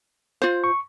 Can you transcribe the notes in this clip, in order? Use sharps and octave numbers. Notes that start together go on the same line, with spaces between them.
F4 C5
C#6